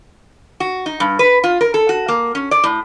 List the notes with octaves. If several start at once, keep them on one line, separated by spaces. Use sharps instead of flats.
F#4
D#4
G2
B4
F4
A#4
A4
F#4
A#3
C#4
D5
A2